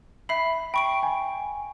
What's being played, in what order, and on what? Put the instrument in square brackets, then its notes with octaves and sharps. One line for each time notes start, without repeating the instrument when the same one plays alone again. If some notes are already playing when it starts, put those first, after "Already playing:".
[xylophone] E5 B5 [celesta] C7
[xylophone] G5 C#6 D7 [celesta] B5
[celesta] G#5